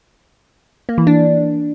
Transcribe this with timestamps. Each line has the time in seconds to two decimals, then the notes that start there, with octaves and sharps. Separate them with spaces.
0.89 A#3
0.98 E3
1.07 D4